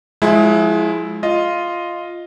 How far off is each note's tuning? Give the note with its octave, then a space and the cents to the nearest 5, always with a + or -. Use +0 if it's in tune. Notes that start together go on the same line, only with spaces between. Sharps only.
F3 +30 G#3 +15 E4 +0
F4 -5 D#5 +0